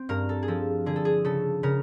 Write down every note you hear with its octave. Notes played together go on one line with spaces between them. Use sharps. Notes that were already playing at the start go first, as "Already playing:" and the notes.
Already playing: C4
G2 A#4
A4
G#4
F3 A4
D3 G#4
A4
G#4
C#3 A4
C#3 A#4